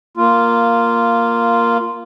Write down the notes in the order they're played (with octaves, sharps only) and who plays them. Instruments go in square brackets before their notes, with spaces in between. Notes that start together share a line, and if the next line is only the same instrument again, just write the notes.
[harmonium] A#3 F4